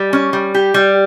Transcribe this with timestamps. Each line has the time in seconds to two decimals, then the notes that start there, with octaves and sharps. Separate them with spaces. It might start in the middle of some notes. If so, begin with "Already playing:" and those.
Already playing: G3
0.13 C#4
0.33 G3
0.54 G4
0.74 G3